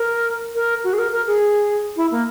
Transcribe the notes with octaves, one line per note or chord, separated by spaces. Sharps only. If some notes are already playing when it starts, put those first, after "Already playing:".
Already playing: A#4
A#4
F#4
G#4
A#4
A#4
G#4
E4
A#3